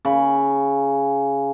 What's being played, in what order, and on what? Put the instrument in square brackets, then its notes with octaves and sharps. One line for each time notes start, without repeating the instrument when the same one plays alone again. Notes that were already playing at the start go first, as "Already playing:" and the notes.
[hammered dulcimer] C#3 B5